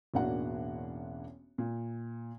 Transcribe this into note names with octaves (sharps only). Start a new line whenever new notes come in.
E1 A1 A#3 D4 F#4 F#5
A#2